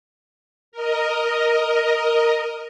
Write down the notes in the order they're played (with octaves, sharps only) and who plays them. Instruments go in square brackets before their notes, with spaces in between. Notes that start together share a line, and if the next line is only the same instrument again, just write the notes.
[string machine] A#4 D#5